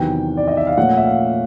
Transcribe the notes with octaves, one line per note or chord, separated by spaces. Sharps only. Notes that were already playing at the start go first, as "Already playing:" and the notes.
Already playing: E2 C3 D#3 F#3 G5
D5
D#5
E5
F5
A#2 F3 A3 C#4 F#5
E5
F5